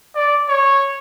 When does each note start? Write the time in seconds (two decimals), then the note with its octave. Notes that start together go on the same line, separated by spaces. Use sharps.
0.15 D5
0.48 C#5